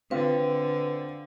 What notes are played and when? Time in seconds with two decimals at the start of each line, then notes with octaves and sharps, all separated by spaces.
0.11 D3 C4 F4 B4